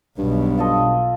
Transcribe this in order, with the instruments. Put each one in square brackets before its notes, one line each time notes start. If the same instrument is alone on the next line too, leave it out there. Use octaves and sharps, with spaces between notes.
[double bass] B1 B2 [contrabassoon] G2
[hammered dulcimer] F4 A4 D#5